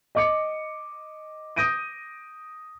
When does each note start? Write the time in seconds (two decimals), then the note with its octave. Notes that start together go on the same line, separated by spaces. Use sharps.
0.15 D#5 D6 C#7
1.56 D#6 G6 A#6 D7 D#7